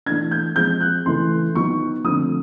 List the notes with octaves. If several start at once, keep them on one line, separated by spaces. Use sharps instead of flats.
E3 A3 D4 G#6
G6
F3 G#3 C4 G6
F#6
C#3 E3 A3 C6
D#3 F#3 B3 C#6
D3 F3 A3 C4 D#6